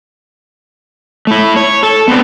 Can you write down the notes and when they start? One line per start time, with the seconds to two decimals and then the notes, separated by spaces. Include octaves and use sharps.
1.27 A3 E4
1.56 C#5
1.83 A4
2.08 B3 C4 D4